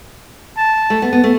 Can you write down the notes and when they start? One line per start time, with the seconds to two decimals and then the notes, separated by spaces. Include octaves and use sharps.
0.58 A5
0.90 A3
1.02 B3
1.13 B3
1.24 A3